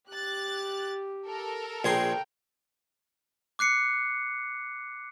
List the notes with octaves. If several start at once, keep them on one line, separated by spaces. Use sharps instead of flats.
G4 F#6 A6
A4 A#4
A#1 G#4 G5 C6
D6 F#6 C7 C#7